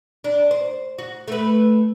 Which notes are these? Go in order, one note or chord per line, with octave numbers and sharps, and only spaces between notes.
D4
C5
F#4
A3 B4